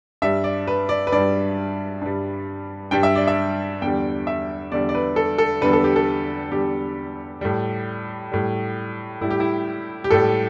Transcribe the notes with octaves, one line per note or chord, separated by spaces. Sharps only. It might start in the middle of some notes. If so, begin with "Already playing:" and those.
G2 G3 E5
D5
B4
D5
B4
G2 G3 D5
G2 G3
G2 G3 G5
E5
D5
E5
E2 D3 G3 G5
E5
E2 D3 G3 D5
D5
B4
A4
A4
E2 D3 G3 B4
A4
G4
A4
E2 D3 G3 G4
A2 G3
A2 G3
A2 G3 E4
G4
E4
G4
A2 G3 A4